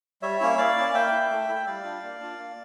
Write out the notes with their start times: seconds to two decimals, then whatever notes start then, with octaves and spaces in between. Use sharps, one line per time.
0.22 G3 C#5 E5
0.40 A#3 C#4 E4
0.58 A#3 D5 F5
0.76 C#4 E4
0.94 A#3 E5 G5
1.12 E4
1.31 A3
1.49 E4
1.55 E5
1.66 G3 D5 F5
1.84 D4 F4
2.03 A#3
2.20 D4 F4
2.38 A#3